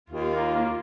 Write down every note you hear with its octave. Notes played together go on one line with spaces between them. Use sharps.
D#2 F4
A#3
A#3